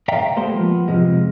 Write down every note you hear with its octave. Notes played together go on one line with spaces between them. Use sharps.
C#5 D5 E5 F5 G5 A#5
G3 G#3 A#3 B3 A4 C5
F3 B3
F2 C3 F3 G#3